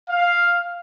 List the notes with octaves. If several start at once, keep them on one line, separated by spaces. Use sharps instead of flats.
F5